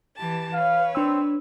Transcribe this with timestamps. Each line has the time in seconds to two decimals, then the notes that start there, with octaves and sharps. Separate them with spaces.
0.16 E3 G4 A5
0.53 B4 C#5 F5
0.95 C4 D4 E6